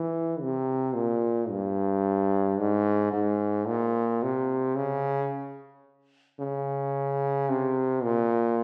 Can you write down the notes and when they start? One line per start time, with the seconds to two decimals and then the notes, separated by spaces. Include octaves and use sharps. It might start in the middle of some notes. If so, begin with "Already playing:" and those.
Already playing: E3
0.41 C3
0.95 A#2
1.50 G2
2.58 G#2
3.13 G#2
3.68 A#2
4.23 C3
4.76 C#3
6.40 C#3
7.50 C3
8.03 A#2